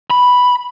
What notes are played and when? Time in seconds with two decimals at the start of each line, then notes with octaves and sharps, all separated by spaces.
0.10 B5